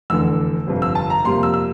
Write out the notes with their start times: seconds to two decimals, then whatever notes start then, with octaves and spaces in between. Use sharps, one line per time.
0.10 F1 E2 D3 E6
0.67 G1 F2 C3
0.82 E6
0.95 A5
1.10 A#5
1.25 F2 C3 G3 A#3 C6
1.43 E6
1.54 E6